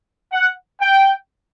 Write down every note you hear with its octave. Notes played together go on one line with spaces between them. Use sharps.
F#5
G5